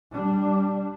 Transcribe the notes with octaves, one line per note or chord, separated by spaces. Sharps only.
G3 D4